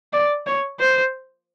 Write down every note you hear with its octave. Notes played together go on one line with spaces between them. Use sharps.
D5
C#5
C5